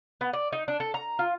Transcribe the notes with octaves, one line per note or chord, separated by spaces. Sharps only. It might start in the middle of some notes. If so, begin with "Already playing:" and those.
B3
D5
D#4
D4
A4
A#5
F4